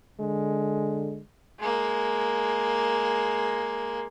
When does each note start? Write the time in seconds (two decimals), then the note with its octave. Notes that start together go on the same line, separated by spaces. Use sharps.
0.20 D3 G#3
1.60 G#3 A#3